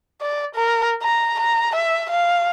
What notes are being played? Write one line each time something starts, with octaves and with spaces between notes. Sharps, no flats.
D5
A#4
A#5
A#5
E5
F5